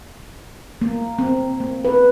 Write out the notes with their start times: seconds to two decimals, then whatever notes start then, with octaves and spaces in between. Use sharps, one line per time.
0.81 A#3
1.19 C4
1.60 A#3
1.85 B4